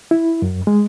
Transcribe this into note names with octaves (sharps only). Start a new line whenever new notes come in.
E4
F#2
G#3